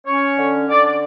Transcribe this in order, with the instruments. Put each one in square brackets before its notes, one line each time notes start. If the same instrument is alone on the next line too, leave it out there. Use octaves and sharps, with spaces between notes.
[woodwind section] C#4 C#5
D3
D3 D5
D5